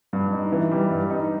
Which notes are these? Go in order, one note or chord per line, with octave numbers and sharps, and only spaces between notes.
G2
D#4
E3
G3
G2
D#4